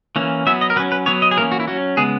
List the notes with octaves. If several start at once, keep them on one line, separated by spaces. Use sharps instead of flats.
E3 A#3 C#4
F#3 B3 E5
D#5
A#4
F#3 C#4 B4
B4
F#3 B3 C#5
D#5
G#4
E3 A#3 C#4 A#4
F#4
E4
F#3 C#4 F#4
C#3 G#3 B3 G#4